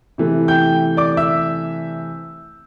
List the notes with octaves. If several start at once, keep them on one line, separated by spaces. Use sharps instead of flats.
C3 E3 A3
G5 G6
D5 D6
E5 E6